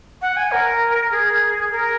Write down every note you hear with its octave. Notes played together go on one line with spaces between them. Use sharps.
F#5
G#5
A#4
G#4
A#4